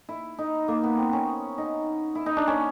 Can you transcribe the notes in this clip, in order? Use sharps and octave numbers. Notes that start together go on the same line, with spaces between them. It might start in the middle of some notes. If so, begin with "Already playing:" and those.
E4
D#4
A#3
B3
C4
C#4
D#4
E4
D#4
D4
C#4